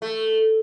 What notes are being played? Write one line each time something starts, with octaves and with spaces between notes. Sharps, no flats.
A3